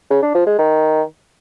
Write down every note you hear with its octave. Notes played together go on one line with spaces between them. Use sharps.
C#3
D4
F3
G#3
D#3